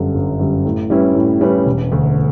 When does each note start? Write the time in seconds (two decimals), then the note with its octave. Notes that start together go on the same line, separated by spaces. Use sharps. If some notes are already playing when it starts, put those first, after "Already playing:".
Already playing: G1 F#2 D3 G3
0.14 G1
0.40 F#2 D3 G3
0.65 A2
0.90 G3 C#4 E4 B4
1.15 A2
1.41 G3 C#4 E4 B4
1.66 E1
1.91 D2 D3